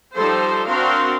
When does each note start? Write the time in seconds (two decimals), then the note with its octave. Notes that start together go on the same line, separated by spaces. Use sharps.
0.17 F3 G3 D#4 A4 C5
0.69 C4 D4 F#4 A#4 F5 C6